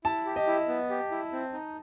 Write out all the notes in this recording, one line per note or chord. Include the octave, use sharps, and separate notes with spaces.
E4 A5
G4
D#5
E4
B3
G4
E4
C4
D#4